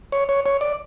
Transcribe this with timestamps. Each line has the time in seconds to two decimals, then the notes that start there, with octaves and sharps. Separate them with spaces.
0.12 C#5
0.29 C#5
0.46 C#5
0.61 D5